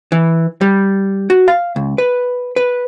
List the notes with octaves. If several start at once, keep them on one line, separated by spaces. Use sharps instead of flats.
E3
G3
F#4
F5
C#2
B4
B4